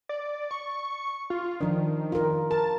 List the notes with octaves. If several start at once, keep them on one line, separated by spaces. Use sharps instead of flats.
D5
C#6
F4
D#3 F3 D4
F4 A#4
A#4 A5